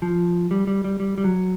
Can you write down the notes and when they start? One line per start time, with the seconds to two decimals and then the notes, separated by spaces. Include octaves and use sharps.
0.02 F3
0.51 G3
0.67 G3
0.84 G3
1.00 G3
1.18 G3
1.24 F#3